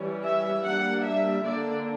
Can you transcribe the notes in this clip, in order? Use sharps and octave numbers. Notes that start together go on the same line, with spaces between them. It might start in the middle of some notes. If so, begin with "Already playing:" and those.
Already playing: E3 G3 C#4
E5
G3 A#3 D4 F#5
E5
D3 A#3 D4 D5